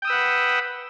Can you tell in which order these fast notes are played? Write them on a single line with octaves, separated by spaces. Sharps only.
G5 D#6 E6 B4 F#5